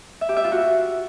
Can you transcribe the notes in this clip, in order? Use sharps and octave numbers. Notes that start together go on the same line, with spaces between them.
E5
G4
E5
F4
F#4